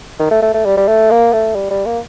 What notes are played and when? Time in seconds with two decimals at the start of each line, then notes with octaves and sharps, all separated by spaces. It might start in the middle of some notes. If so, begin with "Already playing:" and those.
0.19 D#3
0.31 A3
0.42 A3
0.54 A3
0.65 G3
0.77 G3
0.88 A3
1.10 A#3
1.33 A3
1.55 G3
1.70 G3
1.85 A#3